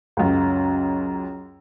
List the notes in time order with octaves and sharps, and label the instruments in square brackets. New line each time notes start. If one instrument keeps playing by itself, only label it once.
[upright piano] C#2 F#2